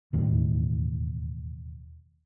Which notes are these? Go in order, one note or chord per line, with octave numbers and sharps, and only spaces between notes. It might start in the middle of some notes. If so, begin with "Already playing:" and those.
E1 D#2 A2